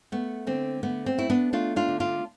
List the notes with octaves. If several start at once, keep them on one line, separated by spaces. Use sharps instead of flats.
A3 B3
D3 C4
A3 B3
C4
A3 E4
B3 D4
A3 D4 F4
D4 F4
D3
D4 F4